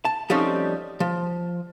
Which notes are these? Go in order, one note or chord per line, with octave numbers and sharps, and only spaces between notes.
A5
F3 G3 A3 C4 C#4 D#4
F3